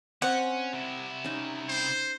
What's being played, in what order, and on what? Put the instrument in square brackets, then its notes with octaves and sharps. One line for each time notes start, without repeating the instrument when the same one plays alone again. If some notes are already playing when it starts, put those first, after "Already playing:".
[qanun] C4 [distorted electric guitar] C#4 [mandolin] F#5
[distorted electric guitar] C3 E4
[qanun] C#4 D#4
[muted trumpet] C5